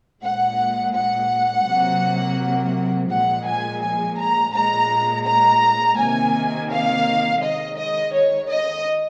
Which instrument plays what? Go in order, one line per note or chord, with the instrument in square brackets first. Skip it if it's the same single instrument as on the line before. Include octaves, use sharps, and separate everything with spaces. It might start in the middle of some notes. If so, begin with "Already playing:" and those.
[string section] A#2 G#3 F#5
F#5
C3 F#3 A#3
A#2 F3 G#3 F#5
G#5
G#5
A#5
A#2 G#3 A#5
A#5
C3 D#3 A#3 G#5
F5
D#3 G#3 D#5
D#5
C#5
D#5